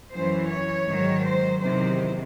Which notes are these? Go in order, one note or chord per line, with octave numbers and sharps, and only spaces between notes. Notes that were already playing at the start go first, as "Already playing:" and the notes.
F#2 E3 C5
C#5
G#2 D#3 F#3
C5
E2 C3 D#3 F#3 C5